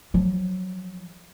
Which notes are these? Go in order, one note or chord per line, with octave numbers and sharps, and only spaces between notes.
F3 F#3